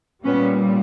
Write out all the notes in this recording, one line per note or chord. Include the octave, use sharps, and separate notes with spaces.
A#2 G3 B3 C#4